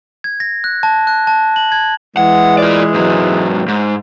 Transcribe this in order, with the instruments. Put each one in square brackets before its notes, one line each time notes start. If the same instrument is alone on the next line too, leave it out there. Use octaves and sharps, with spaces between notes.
[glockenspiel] G#6
A#6
F#6
A5
F#6
A5
F#7
G#6
[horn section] E3 G#3 [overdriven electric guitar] F#5
[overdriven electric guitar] F4 D5
G#2 F#3
G#2